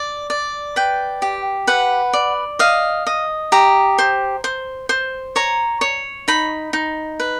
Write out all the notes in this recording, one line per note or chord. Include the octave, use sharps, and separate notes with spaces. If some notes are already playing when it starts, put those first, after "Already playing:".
Already playing: D5
D5
B4 G5
G4
B4 F#5
D5
D#5 F5
D#5
G4 A#5
C5
C5
C5
C#5 A#5
C#5
D#4 B5
D#4
B4